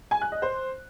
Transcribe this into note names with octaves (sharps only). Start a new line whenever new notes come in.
G#5
F#6
D#5
C5